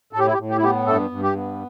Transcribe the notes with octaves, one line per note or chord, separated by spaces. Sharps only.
A2 A4
G4
E4
G4
A2
G4
E4
B3 G4
G2 A3 A4
G2
G4
B3